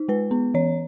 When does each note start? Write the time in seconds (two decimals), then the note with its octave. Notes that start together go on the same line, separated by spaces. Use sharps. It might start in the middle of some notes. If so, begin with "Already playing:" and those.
Already playing: D#4
0.08 G#3 B4
0.31 B3
0.54 E3 C#5